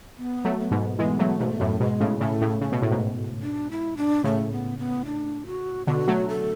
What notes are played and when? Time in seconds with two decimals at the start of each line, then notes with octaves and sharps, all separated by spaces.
0.18 B3
0.45 F#3 A3
0.58 B3
0.71 G#2 B2
0.99 E3 G#3 B3
1.19 F#3 A3
1.39 G#2 B2 A3
1.60 F#2 A2
1.80 G#2 B2 G#3
2.00 A2 C#3
2.20 A2 C#3 A3
2.41 A2 C#3
2.61 C#3 A3
2.72 B2
2.82 A2
2.91 G#2 B2
3.43 D4
3.71 E4
3.97 D4
4.24 A2 C#3 A3
4.52 B3
4.79 B3
5.05 D4
5.46 F#4
5.87 B2 D3 F#4
6.07 F#3 A3
6.28 A4